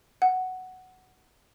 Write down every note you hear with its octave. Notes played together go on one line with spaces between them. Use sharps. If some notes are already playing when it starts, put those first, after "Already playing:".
F#5